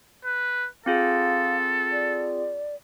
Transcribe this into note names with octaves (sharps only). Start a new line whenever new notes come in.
B4
C4 F4 G#4 A4 F5
D5